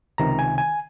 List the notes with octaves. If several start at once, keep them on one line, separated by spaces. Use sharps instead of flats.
C#2 C3 D#3 A#5
G#5
G#5